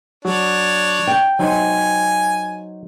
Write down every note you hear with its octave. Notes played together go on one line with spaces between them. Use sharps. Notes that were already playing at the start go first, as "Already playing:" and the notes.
F#3 D4 F#4 C#5
G5
F#3 D#4 C5 G#5